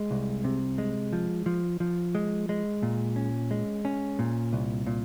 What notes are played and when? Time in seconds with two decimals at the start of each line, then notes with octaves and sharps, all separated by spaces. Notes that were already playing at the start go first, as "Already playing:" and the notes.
Already playing: G#3
0.11 C2
0.44 C3
0.78 G#3
1.13 F3
1.46 F3
1.80 F3
2.15 G#3
2.49 G#3
2.83 A#2
3.16 C#4
3.51 G#3
3.85 C#4
4.19 A#2
4.53 C2
4.86 A#2